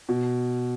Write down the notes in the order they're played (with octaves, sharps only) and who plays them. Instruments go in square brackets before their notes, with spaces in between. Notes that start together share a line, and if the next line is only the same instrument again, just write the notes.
[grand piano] B2